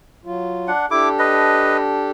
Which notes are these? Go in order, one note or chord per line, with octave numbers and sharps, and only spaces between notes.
F#3 F4
D4 F#5
D4 E4 G4 A4 D6
B4 D#5